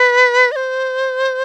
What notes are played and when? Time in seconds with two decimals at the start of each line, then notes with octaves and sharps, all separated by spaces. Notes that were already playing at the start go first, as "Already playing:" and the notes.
Already playing: B4
0.52 D#5
0.56 C5